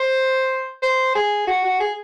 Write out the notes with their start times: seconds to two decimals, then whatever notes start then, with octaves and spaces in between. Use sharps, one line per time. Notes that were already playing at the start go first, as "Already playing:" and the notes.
Already playing: C5
0.82 C5
1.15 G#4
1.47 F#4
1.64 F#4
1.80 G#4